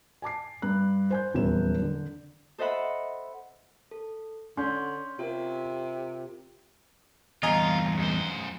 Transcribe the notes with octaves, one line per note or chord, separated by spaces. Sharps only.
G#5 A5 D6 C7
G2 F#6
C5 G#5 G6
D#1 E2 F#3 C#4 E4 E7
D3
A4 C5 D#5 E5 F#5 B5
A4
D3 C#4 C6 G6
C3 F4 A#4
E2 G2 F4 D#5 G#5 A#5
F#2 C5